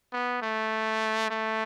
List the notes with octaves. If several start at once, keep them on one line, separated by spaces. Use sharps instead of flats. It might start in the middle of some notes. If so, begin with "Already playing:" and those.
B3
A3
A3